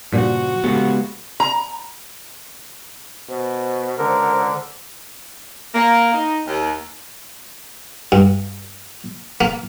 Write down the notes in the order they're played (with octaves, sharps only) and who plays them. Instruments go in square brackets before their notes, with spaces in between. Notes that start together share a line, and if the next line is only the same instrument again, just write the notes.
[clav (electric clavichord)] G2 A#2 [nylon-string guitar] C#3 F3 [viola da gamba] F#4
[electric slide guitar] C#3 G#3 B3 [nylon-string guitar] G4 A4 F5
[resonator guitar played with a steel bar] A#5
[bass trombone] B2 [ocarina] C5
[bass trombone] C#2 [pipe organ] D3 [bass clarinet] A#4
[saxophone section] A#3
D#4
D#2
[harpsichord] G2
A#3